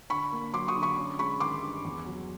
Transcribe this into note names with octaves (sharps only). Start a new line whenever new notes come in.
D3 B5 C#6
A#3
F#3 C6 D6
C#6 D#6
D3
B5 C#6
C#4
G#3 B5 C#6
D#3 C6 D6
G2
E2
F#3